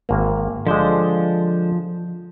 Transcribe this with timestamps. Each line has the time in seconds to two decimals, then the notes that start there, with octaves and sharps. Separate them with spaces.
0.09 G#1 A#3
0.66 D3 F3 G#3 C5